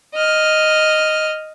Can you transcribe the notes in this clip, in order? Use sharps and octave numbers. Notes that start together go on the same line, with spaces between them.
D#5 F6